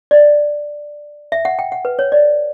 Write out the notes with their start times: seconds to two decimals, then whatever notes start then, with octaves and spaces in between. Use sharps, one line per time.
0.11 D5
1.32 E5
1.45 F#5
1.59 G5
1.72 F#5
1.85 B4
1.99 C#5
2.12 D5